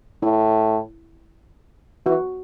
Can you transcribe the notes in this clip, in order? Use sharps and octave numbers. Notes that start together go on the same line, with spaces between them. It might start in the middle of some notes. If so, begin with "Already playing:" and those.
A2 E4
E3 F#4